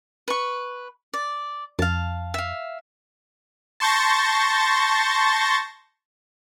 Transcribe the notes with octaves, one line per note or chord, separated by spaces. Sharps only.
B4 C#6
D5
F2 F5 A5
E5 F5
A5 C6 C#6 G6 A6 A#6